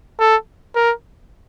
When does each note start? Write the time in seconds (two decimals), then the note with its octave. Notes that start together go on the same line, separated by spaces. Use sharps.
0.19 A4
0.75 A#4